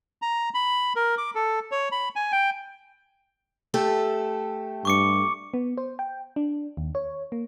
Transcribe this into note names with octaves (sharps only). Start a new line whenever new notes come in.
A#5
B5
A#4
D6
A4
C#5
B5
G#5
G5
A3 G4 A4
G2 C#6 D6 C#7
B3
C5
G5
D4
D#2
C#5
A#3